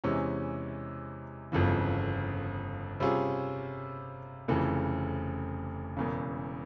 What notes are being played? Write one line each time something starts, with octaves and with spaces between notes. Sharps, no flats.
E2 C3 E3 G#3 C#4
G1 F2 C#3 E3
C3 G3 C#4 F4 G#4
F1 F2 C#3 E3
E1 E2 C#3